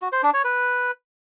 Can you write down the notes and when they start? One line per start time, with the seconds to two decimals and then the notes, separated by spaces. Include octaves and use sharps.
0.02 F#4
0.12 C5
0.23 D4
0.34 C#5
0.44 B4